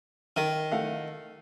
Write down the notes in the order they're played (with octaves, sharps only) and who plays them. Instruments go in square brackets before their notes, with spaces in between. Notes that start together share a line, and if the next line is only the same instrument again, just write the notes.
[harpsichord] D#3 [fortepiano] A#4
[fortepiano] A3 F5 F#5